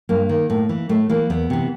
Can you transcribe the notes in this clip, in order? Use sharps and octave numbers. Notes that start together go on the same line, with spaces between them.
G2 A#3
D#3
A2
E3
A2 A3
E3 A#3
E2 B3
C3 E3